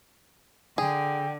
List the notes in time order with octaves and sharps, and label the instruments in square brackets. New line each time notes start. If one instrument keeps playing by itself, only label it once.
[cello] D3 [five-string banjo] G#4 [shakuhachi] G5